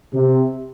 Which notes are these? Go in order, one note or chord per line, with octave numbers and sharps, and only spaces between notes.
C3